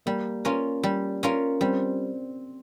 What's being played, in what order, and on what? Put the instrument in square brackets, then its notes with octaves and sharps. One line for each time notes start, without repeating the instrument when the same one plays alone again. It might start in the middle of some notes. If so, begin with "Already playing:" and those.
[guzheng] G3 [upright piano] A#3
[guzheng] C#4 F4 A#4
G3
C#4 F4 A#4
[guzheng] G3 [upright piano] C4